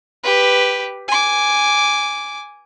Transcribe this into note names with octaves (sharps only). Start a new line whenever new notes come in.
G4 B4
G#5 D6